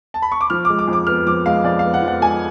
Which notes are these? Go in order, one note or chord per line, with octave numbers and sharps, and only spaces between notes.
A5
B5
C#6
D6
F3 F6
G#3 D6
D6
F2
D6
B3 F6
F3 D6
G#3 F5
F2 D5
B3 F5
F#5
F3
F#5
G#3 G#5